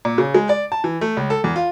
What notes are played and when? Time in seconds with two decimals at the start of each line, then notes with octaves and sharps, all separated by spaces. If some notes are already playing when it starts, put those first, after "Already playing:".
0.05 A#2
0.18 C#3
0.35 G#3
0.49 D5
0.72 A5
0.84 E3
1.01 A3
1.17 C#2
1.30 A4
1.44 E2
1.56 F4